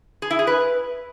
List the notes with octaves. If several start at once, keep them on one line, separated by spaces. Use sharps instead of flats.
G#4
E4
G#4
B4